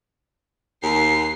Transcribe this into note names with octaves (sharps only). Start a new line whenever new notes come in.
D#2 C7